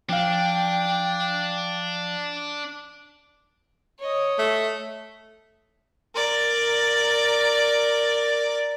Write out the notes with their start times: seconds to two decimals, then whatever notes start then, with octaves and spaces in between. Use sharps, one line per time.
0.09 F3 D4 F5 G5
3.99 C#5 D#5
4.39 A3
6.15 A#4 D5